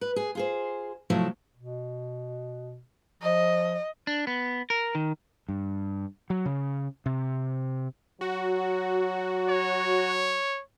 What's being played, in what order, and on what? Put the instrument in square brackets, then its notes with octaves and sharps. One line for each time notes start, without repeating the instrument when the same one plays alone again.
[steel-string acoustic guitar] B4
G#4
F4 G#4 C5
C3 F3 F#3 A3 E4
[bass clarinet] B2
[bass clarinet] F3 [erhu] D#5
[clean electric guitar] D4
B3
A#4
D#3
[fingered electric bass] G2
F#3
C#3
C3
[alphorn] F#3 [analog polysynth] F#4
[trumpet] C#5